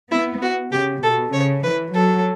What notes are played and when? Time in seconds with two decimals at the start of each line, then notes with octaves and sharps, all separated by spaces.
0.11 B3 E4
0.42 F#4
0.72 C#3 G4
1.02 B2 A4
1.33 C#3 C#5
1.63 E3 B4
1.93 F#3 A4